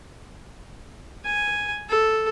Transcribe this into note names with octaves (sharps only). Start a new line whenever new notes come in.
G#5
A4